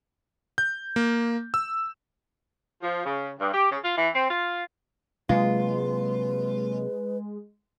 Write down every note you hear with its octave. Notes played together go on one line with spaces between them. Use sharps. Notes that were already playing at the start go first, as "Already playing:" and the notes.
G6
A#3
E6
F3
C#3
G2
G4
C#3
F4
E3
C4
F4
C3 F#3 G#3 A#3 F4 B4